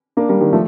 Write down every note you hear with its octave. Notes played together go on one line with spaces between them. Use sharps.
A#3 D4
G3 A#3
D#3 G3
F3 A3